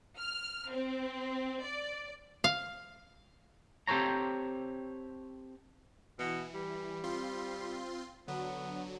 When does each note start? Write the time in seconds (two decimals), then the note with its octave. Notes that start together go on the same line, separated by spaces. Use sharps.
0.17 F6
0.71 C4
1.63 D5
2.44 F5
3.87 C4 G4 A4 C5 C#5 A#5
6.19 B2 E3
6.54 G3
7.04 C4 F4 C6
8.28 D3 F#3 B3